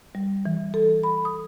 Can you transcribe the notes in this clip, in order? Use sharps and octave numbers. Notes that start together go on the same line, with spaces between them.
G3
E3
A4
B5
D#6